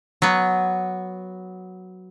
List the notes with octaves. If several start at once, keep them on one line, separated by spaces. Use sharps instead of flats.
F#3 B3